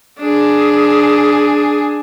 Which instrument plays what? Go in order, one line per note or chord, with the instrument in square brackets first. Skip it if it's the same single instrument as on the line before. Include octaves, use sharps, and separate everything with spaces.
[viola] D4 G#4